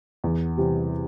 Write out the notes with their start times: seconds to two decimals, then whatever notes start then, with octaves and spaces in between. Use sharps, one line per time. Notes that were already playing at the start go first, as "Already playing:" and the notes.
0.24 E2
0.57 C3 E3 G3